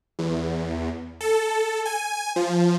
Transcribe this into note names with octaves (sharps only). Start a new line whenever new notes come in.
E2
A4
G#5
F3